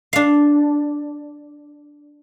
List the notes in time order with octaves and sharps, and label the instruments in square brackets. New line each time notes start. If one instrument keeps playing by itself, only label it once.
[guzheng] D4 F5